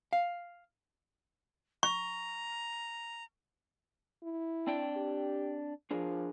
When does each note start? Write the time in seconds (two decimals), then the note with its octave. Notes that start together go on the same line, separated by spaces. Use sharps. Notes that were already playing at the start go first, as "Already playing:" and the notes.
0.13 F5
1.83 A#5 C#6
4.23 E4
4.67 C4 D4 G5
4.97 G4
5.91 F3 D4 G#4 A#4